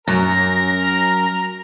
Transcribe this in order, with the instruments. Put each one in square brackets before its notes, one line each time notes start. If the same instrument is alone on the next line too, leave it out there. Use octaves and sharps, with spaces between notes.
[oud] F#2 [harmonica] A#4 A#5 [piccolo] A#6